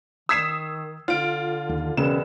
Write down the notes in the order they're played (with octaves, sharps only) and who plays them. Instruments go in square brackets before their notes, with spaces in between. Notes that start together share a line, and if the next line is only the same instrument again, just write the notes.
[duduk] D#3 [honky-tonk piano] D#6 B6 E7 [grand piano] E6 G#6 C7
[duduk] D3 [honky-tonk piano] F4 D7
[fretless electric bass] D#2
[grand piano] E1 [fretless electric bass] C#3 [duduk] B4 [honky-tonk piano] E7